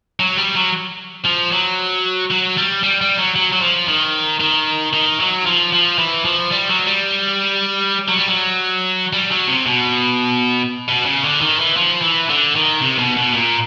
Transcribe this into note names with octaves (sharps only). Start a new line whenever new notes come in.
F#3
G3
F#3
F3
F#3
F#3
G3
G3
G3
F#3
F#3
F#3
F3
D#3
D#3
D#3
F#3
F3
F3
E3
F3
G3
F#3
G3
F#3
G3
F#3
G3
F#3
C3
B2
B2
C#3
D3
D#3
E3
F3
E3
D3
D#3
C3
B2
B2
A#2